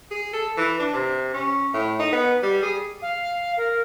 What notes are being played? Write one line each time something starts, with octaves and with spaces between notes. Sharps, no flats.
G#4
A4
E3
D4
C3
C#4
A2
D#4
B3
G3
G#4
F5
A#4